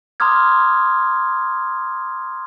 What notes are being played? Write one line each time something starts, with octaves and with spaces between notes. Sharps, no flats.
A#5 C6 D6 D#6 F6 G#6